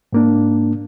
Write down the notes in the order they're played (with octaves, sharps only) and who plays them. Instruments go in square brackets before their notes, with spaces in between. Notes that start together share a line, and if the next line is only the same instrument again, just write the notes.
[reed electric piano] G#2 A#3 D4